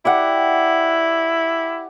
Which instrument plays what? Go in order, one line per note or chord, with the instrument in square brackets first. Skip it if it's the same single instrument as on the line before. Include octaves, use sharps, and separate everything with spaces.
[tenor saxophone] E4 [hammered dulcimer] G4 D5 F#5